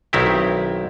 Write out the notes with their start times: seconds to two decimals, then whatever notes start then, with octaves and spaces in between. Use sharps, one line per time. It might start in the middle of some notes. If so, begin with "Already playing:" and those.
0.13 B1 D#3 C4 E4 G4